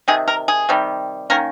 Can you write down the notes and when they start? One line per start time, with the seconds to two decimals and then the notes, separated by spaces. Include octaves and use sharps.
0.08 C3 D#3 G#4
0.28 A#4
0.48 G#4
0.69 C3 D#3 G3
1.30 D#3 A#3 C#4 A#4